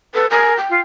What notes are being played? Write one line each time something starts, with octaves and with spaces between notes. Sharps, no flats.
A4 B4
A#4 G#5
G5
F4